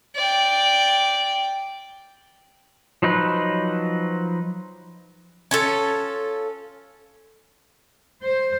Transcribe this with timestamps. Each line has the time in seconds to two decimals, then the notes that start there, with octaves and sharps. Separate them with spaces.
0.16 D5 G5
3.02 F3 F#3 D#4 B4
5.51 C#4 F4 A4
8.22 C5